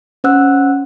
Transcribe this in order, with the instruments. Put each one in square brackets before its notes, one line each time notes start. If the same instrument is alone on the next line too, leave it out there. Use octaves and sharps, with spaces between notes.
[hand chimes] C#4 C5 F#5 E6 F#6